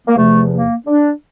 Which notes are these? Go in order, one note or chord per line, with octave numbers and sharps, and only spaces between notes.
A#3
E2 C3 F3 A3
A#3
D4